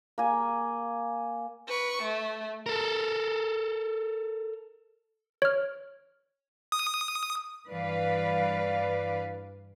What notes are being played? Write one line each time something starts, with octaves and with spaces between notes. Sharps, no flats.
A#3 G#5
B4 C#6
A3
A4 A#4
C#5 F6
D#6
G2 E3 B4 D5 F5